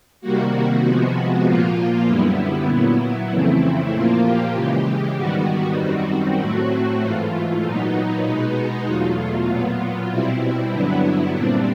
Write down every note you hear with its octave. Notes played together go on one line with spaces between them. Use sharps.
C3 D#3 G3 A#3 F#4
C3 F3 G#3 B3 F#4
A#2 F3 A#3 F4
F#2 D3 G3 B3 E4
A#2 F#3 B3 E4
F2 C#3 E3 A3 C4
A#2 F3 A#3 F4
G4
C#3 E3 G#3 G4
G#2 D#3 G3 B3 F#4
F#2 D#3 G3 C4
A2 F#3 A3 C4 F#4
G#2 E3 A3 F4
A#2 F#3 B3 D#4
B2 G#3 B3
E2 B2 F#3 A3 F4
A#2 F#3 B3
B2 G3 C4 E4
G2 D3 F#3 B3
A#2 G3 C4 D4